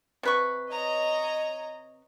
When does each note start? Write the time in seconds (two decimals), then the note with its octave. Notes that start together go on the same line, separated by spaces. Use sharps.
0.23 C3 B4 C#6
0.70 C#5 D#5 A#5